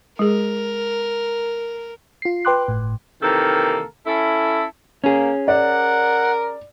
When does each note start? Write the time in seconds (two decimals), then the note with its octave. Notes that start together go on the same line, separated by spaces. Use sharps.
0.19 G#3 G#4 A#4
2.22 F4 C7
2.45 B4 G5 C6 D6 F#6
2.68 G1 A2
3.22 C3 D#3 E3 A#3 A4 A#4
4.07 C#4 E4 A4
5.04 A#3 C#4 G#4
5.48 A#4 D5 F#5